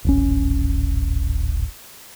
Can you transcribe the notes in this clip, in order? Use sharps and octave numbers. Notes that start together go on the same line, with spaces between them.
D1 G#1 C#4